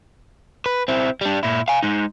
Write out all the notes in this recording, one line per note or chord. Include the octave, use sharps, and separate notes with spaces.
B4
C4 E4
G3 D4
A#2 E4
F5 G#5
G#3 D#4